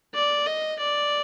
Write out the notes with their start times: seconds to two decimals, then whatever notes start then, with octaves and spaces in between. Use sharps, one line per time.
0.14 D5
0.46 D#5
0.79 D5